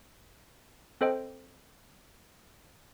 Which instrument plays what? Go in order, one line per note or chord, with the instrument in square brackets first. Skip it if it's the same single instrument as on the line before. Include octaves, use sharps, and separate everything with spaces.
[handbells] C4 A4 C5 D#5 G5